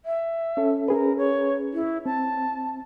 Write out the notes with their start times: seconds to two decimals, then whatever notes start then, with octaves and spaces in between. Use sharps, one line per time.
0.06 E5
0.57 C#4 A4
0.88 C#4 G#4 A#4 B4
1.17 C#5
1.73 E4
2.06 C4 A5